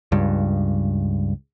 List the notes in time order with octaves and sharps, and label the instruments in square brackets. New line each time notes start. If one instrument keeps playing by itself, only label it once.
[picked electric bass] C#2 G2